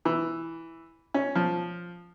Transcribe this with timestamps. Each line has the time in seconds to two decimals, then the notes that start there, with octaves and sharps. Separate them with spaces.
0.05 E3
1.14 C#4
1.35 F3